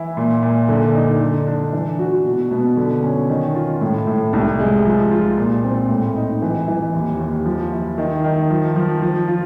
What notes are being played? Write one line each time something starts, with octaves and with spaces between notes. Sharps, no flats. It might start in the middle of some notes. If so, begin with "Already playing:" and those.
Already playing: E3 E4
A#2
A#2
D3
D#4
D3
D4
E3
F#4
B2
B2
D3
C#4
D#3
F4
A2
A2
C2
G#3
F3
F4
A#2
C4
A2
D#4
E3
E3
D#2
D#2
F3
E4
D#3
D#3
F3
F3
F3
F4